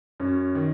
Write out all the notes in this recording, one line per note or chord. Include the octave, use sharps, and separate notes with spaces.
F#2 C#4
D#3